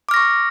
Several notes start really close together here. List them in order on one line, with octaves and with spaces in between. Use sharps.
D6 F6 A#6 C#6